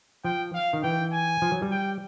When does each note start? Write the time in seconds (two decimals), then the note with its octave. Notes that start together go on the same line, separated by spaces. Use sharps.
0.24 F3 G5
0.54 F5
0.73 D#3
0.83 E3 G5
1.13 G#5
1.42 F3
1.52 F#3
1.62 G3
1.71 G5